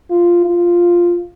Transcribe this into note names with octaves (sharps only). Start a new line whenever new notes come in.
F4
F4